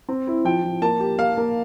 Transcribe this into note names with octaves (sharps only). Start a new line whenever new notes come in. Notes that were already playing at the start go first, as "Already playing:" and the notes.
C4
E4
F3 G5
F3
A#3 A5
G4
A#3 F5
A#3